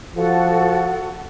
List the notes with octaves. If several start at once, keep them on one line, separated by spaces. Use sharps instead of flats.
F3 F#4 A4 F#5